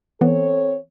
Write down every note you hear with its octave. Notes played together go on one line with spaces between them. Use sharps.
E3 B3 C4 A4 C#5